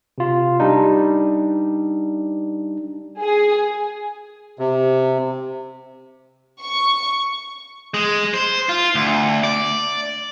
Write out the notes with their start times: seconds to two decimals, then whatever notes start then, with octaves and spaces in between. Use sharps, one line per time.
0.18 C3 F4
0.60 G3 D4 D#4
3.20 G#4
4.59 C3
6.61 C#6
7.94 G#3
8.34 C5
8.69 F4
8.95 D2
9.44 D5